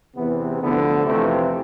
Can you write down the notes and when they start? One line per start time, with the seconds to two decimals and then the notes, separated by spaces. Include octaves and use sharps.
0.16 E2 C3 E3 B3
0.61 D2 D3 F3 B3
1.06 F2 C3 E3 A3